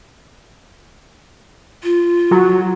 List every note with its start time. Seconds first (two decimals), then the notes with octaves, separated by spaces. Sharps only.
1.83 F4
2.31 F#3